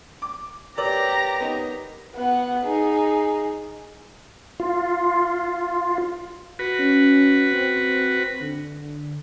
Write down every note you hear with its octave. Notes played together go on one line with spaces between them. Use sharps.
D6
G4 A#4 B4 C#5 D5 A#5
B3 D#4
B3 F#5
D#4 G#4
F4
F#4 B4
C#4
C4
D3